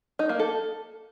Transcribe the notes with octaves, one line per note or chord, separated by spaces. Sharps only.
D#4
A#3
A4